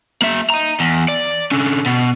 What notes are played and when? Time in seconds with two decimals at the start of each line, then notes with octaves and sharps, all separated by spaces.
0.22 A#3 E5
0.50 D#5 A#5
0.80 E2
1.08 D5
1.51 D3 C#4
1.86 B2